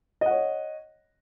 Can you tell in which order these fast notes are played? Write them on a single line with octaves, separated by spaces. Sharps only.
D#5 F#5 C#5